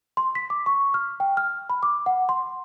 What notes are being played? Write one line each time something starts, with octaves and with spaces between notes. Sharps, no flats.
C6
B6
D6
C#6
F6
G5
F6
B5
D6
F#5
C6